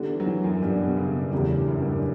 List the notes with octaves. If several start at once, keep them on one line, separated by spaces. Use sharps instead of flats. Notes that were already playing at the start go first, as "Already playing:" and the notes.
Already playing: D3 G3 B3 E4 G4 D5
E3
F#3
E3
F#2
G2 G3 B3 E4 G4 D5
B2
C#3
B2
E2 A2 C#3 G3
G2
F#2
F#2
G2